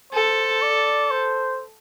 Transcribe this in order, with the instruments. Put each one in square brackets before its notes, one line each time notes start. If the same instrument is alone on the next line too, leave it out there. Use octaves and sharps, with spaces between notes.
[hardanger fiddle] A4 [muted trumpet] C5
[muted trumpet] D5
C5